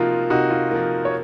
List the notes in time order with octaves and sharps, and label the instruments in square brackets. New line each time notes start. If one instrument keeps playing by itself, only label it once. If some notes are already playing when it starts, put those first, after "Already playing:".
Already playing: [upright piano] C3 F3 A#3 [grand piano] D#4 F4 F#4
[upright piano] C3 [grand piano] D#4 F#4
[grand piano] F4
[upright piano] F3 A#3 [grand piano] F4
[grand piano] C#5